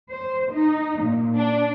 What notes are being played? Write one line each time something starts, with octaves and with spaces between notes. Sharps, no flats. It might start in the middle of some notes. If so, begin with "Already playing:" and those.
C5
D#4
A#2
D4